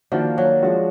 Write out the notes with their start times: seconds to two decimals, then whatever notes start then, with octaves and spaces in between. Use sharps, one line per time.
0.12 D#3 F3 A#3 D4 F#4
0.38 F#3
0.63 F3 G#3 D4 F#4